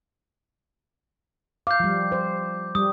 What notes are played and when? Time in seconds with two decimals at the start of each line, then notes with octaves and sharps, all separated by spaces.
1.67 F5 D6 G6
1.80 F3 G3
2.12 C5
2.75 G3 D#6